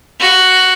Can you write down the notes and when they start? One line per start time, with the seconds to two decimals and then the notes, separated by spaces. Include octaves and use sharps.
0.20 F#4